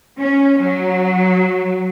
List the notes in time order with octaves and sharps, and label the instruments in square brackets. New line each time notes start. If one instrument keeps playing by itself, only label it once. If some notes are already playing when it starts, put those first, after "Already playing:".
[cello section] C#4
F#3